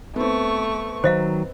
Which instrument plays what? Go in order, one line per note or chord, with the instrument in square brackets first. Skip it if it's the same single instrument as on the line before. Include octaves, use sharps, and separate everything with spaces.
[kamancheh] A3 C#6 [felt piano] B3 C4
[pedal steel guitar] D#3 F#3 [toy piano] C5 D#5 F5